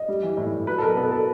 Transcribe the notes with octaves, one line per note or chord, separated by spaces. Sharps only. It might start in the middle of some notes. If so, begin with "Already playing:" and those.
Already playing: D#5
G3
E3
A2
A2
F#3 B4
A4
B2 A#4
B3 A4
A4